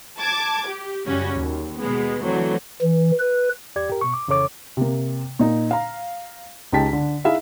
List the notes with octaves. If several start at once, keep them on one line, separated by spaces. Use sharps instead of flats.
A5 D6 G#6
G4
F#2 C#3 G3 C#4 F#4
D#2
B2 G#3 B3
D3 E3 F#3 A3 C4
E3
B4
E2 G4 D5 G#6
G4 A#4
B2 C#6
D6
F2 C#3 E3 A4 C#5 D6
C3 A#3
A#2 D#4
F5 A#5
C#2 D#4 G4 G5 A5 B6
D3
D#4 E4 G#4 E5 F5